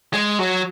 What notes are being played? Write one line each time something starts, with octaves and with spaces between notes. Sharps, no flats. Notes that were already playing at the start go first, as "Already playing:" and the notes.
G#3
F#3